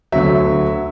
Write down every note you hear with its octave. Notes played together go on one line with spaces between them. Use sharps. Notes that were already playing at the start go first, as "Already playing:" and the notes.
D2 D3 F#3 E5